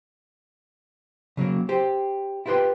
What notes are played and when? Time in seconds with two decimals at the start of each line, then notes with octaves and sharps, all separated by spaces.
1.37 C#3 F#3 G#3 A#3
1.69 G4 C5
2.46 E4 F4 G4 B4 G5 C6